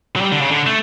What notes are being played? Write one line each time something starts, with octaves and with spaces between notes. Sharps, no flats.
F#3
G3
D3
C#3
D3
A3